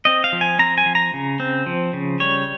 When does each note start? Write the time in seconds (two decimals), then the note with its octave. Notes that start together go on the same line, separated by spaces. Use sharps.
0.05 C4 D#5
0.24 F5
0.33 F3
0.41 G#5
0.59 C4 A#5
0.78 G#5
0.86 F3
0.95 A#5
1.14 C#3
1.40 C4
1.66 F3
1.93 C#3
2.20 G3 C#5